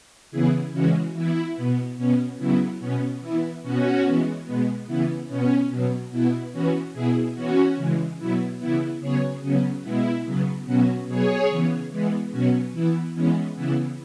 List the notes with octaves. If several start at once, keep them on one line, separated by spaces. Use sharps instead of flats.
C#3 E3 B3 E4 G#4
C#3 E3 G#3 C#4 F#4
E3 B3 E4
B2 B3
B2 B3 C#4
C#3 F#3 B3 E4
B2 B3 C#4
E3 B3 E4
B2 B3 C#4 F#4
E3 G#3 B3
B2 G#3 B3
C#3 E3 B3 E4
B2 B3 C#4
B2 F#3 B3
B2 B3 E4
E3 B3 C#4 F#4
B2 B3 E4 G#4
E3 B3 C#4 F#4
C#3 E3 G#3
B2 F#3 B3 E4
C#3 E3 B3 E4
C#3 F#3 B3 G#4 C#5
C#3 F#3 B3 C#4
B2 G#3 B3 E4
C#3 F#3 B3
B2 F#3 B3 C#4 F#4
B2 F#3 B3 G#4 C#5
C#3 E3 B3
E3 G#3 B3
B2 F#3 B3 C#4 F#4
E3 B3 E4
E3 G#3 B3 C#4
C#3 E3 B3 E4